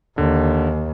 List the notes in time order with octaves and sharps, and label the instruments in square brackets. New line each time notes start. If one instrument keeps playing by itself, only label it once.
[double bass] D#2 [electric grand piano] D3